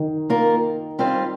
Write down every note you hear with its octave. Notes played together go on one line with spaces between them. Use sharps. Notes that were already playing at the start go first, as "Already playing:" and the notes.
Already playing: D#3
A#3 F4 A#4
G3 C4 F4 C5